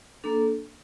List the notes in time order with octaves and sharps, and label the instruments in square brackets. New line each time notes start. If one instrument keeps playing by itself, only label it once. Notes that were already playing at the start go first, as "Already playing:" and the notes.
[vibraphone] A#3 D4 A4